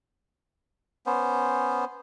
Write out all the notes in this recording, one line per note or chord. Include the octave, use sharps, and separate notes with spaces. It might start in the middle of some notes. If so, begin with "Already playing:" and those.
B3 C#4 C5